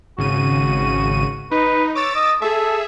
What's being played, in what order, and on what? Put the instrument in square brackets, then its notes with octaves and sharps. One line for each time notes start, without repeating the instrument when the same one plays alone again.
[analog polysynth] G#1 C#3 D#7 [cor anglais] F#4
[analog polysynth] D#4 [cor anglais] B4
[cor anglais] C#5 [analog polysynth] D6 E6 A6
[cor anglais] D#5
[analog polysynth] G#4 E5 [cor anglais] A4